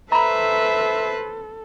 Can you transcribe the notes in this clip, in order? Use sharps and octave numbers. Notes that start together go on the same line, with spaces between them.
A4 B4 C5 E5 A#5 B5